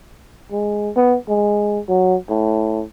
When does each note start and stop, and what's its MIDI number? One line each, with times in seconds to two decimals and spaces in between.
0.51 0.90 56
0.96 1.17 59
1.28 1.79 56
1.88 2.15 54
2.30 2.83 45